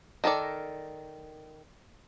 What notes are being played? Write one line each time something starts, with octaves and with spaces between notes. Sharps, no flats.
D#3 A4 A#4 D5